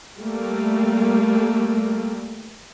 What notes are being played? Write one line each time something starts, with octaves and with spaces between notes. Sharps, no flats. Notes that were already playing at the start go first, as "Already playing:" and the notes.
G3 A3 A#3